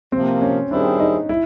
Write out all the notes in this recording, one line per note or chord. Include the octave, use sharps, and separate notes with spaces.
C3 F3 A#3 C4
C#4
D#3 G3 C4 D4 E4 G#4
D#4
E4